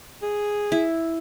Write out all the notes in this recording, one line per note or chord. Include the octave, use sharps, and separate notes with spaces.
G#4
E4